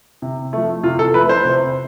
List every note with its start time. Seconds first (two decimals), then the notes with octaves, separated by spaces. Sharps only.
0.22 C3
0.53 F3 A3
0.83 C3 F4
0.99 A4
1.14 F3 A3 B4
1.29 C5
1.45 C3